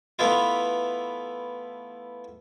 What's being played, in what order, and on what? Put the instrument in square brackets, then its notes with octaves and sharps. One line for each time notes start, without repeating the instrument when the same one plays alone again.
[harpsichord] E3 A3 B3 E4 F4